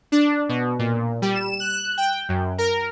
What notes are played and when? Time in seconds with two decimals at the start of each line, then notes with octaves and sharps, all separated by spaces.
0.12 D4
0.49 B2
0.79 A#2
1.22 G3
1.35 E7
1.60 F#6
1.98 G5
2.29 F#2
2.58 A#4